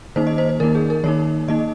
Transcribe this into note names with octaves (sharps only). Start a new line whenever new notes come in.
D#3 A#3 D#4 C5
D#5
C5
C5
D#3 A#3 D#4 A#4
G#4
A#4
D#3 A#3 D#4 C#5
D#3 A#3 D#4 D#5